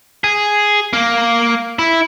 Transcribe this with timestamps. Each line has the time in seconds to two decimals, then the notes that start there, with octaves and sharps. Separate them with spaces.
0.24 G#4
0.93 A#3
1.79 E4